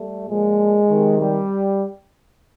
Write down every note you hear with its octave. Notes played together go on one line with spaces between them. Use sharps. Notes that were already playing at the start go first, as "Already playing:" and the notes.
Already playing: G3 A3
A#2 F3 G#3
C3 D#3
G3